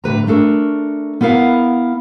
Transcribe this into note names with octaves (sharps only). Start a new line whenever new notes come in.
A2 D3 B4 A#5
A3 D4 A4 A#4
B3 E4 A#4 F5 F#5